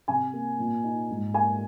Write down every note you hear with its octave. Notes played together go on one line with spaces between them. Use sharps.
C3 G#5
A#3
A#2
D#4
G#2
A#3 G#5